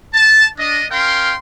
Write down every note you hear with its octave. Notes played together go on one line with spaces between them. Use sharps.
A5
D4 D#5
C#4 A#4 F5 G5 C6